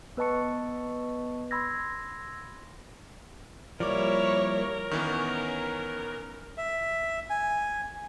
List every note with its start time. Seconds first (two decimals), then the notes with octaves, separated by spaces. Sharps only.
0.17 B3 B4 D#5 A5 C#6 C#7
1.51 B5 C6 E6 G#6 A#6
3.80 F3 G3 A#3 E4 A#4 C#5 D5 D6
4.91 D#3 E3 B3 C#4 C#6
6.57 E5
7.30 G#5